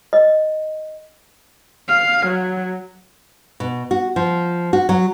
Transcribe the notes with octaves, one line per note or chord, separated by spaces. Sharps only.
D#5
F5
F#3
B2
F#4
F3
F#4
F#3